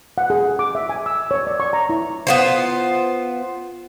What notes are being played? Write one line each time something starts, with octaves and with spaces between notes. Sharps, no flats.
F#5
G#4
D6
E5
G#5
E6
C#5
D5
C#6
A#5
E4
B3 F4 C5